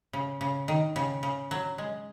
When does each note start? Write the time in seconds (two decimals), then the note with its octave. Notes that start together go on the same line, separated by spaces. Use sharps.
0.13 C#3
0.41 C#3
0.68 D#3
0.96 C#3
1.23 C#3
1.51 F#3
1.78 G#3